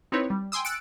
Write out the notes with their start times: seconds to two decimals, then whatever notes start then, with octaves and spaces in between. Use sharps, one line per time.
0.12 C4 D#4 E4 B4 C#5
0.30 G3
0.52 G5 G#5 C6 D#6 E6
0.65 E6 F#6 A6 C#7 D7